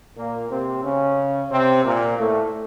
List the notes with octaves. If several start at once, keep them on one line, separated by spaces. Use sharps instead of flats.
A#2 A#3
C3 C4
C#3 C#4
C3 C4
A#2 A#3
A2 A3